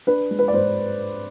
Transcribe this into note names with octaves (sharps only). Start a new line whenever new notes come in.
D4 B4
G#3
B4
D5
G#2 C5